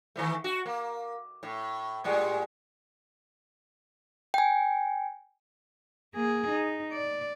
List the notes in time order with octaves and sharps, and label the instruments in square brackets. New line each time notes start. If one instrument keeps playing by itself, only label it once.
[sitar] D#3 E3 A3
F#4
A#3
A2
A2 G3 G#3
[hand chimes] G5 G#5
[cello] A#3 G#4
D#4
D5